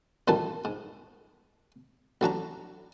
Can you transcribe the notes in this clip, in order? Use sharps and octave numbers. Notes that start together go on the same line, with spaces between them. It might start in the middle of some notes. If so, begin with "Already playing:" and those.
A1 G2 A#2 D#3 G3 A5
G#2
A1 F#3 D4 A#5